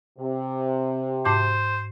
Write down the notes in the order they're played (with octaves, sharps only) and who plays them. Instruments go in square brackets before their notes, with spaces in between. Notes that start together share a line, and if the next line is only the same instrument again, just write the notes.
[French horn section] C3
[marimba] G#2 D6 [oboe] C5